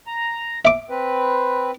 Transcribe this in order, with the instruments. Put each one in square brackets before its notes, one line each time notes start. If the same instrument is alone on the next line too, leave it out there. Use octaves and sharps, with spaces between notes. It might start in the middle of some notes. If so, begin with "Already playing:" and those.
[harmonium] A#5
[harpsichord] E5 D6
[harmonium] C4 B4